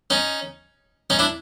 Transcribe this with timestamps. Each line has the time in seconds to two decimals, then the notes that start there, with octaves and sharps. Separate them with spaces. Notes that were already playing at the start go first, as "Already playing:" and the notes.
0.10 C#4 D#4
1.10 C#4 D#4
1.19 D4 E4